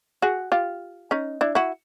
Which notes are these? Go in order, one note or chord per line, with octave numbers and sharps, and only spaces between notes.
F#4 G#4
F4 G4
C#4 D#4
D4 E4
E4 F#4